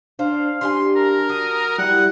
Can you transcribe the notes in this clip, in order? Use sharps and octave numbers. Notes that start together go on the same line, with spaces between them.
D4 C5 F5
E3 D4 G4 G#5 C6
A#4 A#5
F#3 D#6
G3 E4 F#5